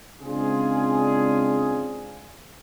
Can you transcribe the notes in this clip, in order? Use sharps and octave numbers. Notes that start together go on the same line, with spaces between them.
C#3 G#3 C4 D4 F4 G#4